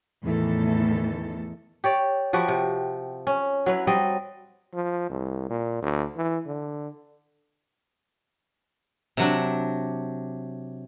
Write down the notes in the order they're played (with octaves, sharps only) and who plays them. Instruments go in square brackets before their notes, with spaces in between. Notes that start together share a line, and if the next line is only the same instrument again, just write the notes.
[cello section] E2 A2 D#3 E3 A4
[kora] G4 C#5 D5
F3 F#4 G4 B4
C3
C#4
F#3 E4 B4
F#3 G3 C4 D#5
[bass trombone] F3
C2
A#2
D2
E3
D3
[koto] C3 F#3 D4